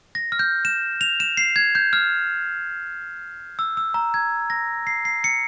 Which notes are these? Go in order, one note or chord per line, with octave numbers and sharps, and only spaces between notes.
A#6
F6
G6
E7
F7
E7
C7
G#6
G6
F6
E6
E6
A#5
G#6
A#6
C7
C7
C#7